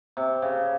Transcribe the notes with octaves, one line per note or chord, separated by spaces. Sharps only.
C3
C#3